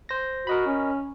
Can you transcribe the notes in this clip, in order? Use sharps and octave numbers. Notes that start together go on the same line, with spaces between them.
C5 A#6
F#4 A#4 D#5 B5
C#4